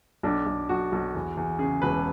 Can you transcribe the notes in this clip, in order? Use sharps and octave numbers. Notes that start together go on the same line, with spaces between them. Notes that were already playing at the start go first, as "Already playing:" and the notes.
B1 D4
B1
B1 F#4
B1
E2
E2
C#3 G#4
E1 B4